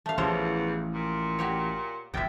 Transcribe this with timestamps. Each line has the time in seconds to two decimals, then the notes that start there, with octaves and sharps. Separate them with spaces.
0.06 A3 F5
0.18 A1 E2 F3 C5 C#5
0.94 A#2
1.39 F#4 G4 C#5
2.14 E1 A#1 F2 E5 G5